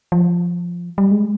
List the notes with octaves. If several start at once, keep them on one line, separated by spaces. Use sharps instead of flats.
F3
G3
G#3